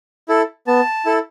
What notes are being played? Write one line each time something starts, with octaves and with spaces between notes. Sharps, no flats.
E4 A4
B3 A5
E4 A4